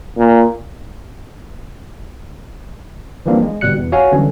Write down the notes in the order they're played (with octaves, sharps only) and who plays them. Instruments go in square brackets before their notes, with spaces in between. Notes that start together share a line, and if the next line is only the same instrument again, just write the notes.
[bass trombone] A#2
[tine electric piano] E3 F3 G3 A#3 C4 D4
G#3
G1 G#2 B2 G3 F#6 C#7
E2
F#4 C#5 F5 G#5
D3 E3 F#3 G3 C#4